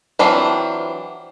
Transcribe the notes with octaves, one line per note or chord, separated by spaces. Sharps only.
E3 F#3 C4 D4 F4